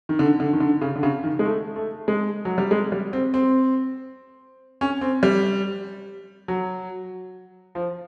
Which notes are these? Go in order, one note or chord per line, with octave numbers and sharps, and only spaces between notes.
D#3
D3
D3
D#3
D3
C#3
D3
C#3
D#3
G#3
A3
A3
G#3
F#3
G3
G#3
G3
C4
C4
C#4
C4
G3
F#3
F3